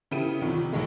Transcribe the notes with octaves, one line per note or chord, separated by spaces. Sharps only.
C#3 B3 E4 G4 A4 D#7
C2 C3 D#3 F3
B1 B2 D#3 G#3 A3